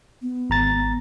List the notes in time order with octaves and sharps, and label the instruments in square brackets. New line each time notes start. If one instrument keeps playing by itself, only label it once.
[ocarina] B3
[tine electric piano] G#1 A#5 A6